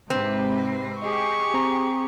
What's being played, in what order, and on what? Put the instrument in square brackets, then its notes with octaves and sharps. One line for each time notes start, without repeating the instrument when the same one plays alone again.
[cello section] G#2 C3 B4 [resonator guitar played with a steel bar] C4
[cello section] G4 G#4 [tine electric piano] D#5 [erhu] C#6
[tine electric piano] C4 A#5